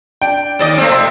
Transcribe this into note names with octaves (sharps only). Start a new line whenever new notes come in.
D4 G5
D#2 D5 D#5
A3 C4
F1 D#5 C6